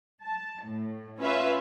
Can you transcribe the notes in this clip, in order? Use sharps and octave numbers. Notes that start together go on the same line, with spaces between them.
A5
A2
C#4 F4 B4 E5 F5